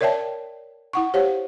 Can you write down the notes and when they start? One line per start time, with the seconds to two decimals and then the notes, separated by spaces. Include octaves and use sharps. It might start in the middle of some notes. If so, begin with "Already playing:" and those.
0.01 A#4 C#5 D5 E5 G5 A5
0.93 E4 F#5 C#6
1.14 G4 C5 C#5 F5 F#5